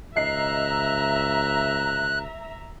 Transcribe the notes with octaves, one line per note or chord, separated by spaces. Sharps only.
C#2 D#5 E5 A#5 F#6 C7